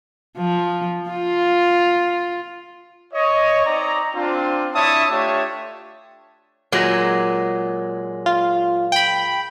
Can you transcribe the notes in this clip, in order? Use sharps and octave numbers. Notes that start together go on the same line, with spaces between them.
F3
F4
C#5 D#5
C4 D#4 D5 A#5
C4 D4 F4
D4 E4 C#5 E5 A5 D#6
A3 D4 F4 G4 C#5 E5
A#2 F#3 G#3
F4
G5 B5